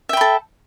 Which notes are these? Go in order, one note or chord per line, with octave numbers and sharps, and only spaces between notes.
A4 E5 G5 B5